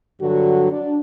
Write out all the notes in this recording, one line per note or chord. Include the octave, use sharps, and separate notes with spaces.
G2 D3 F#3 F#4
D4